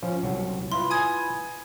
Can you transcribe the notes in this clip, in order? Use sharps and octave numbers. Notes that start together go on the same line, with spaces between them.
F3 C#4
C2 F#3
E4 F4 B4 C6
G#5 D#6 G#6